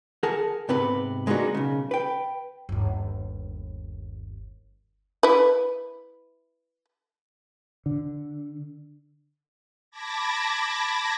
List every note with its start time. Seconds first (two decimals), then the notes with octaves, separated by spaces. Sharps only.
0.23 G#4 A#4 F#5 A5
0.69 G#2 C3 B3 B4
1.27 G#3 A#3 B3 D4 D#4 F#4
1.55 B1 C#3
1.91 B4 G5
2.69 G1 D#2
5.23 E4 B4
7.86 D3
9.91 A5 B5 D6 G#6 A#6